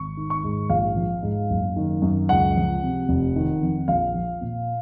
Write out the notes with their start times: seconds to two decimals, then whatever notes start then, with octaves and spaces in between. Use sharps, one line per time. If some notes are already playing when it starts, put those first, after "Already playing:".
Already playing: G#1 C#6
0.17 D#3
0.30 C#6
0.44 G#2
0.69 A#1 F5
0.96 F3
1.23 G#2
1.50 F#1
1.76 D#3
2.02 F#2
2.29 C#2 F#5
2.56 F3
2.82 C3
3.09 F1
3.36 D#3
3.62 F2
3.88 A#1 F5
4.14 F3
4.41 A#2